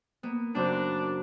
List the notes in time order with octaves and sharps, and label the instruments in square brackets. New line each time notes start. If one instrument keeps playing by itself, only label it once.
[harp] A#3 B3
[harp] F#2 C#3 C4 [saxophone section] D4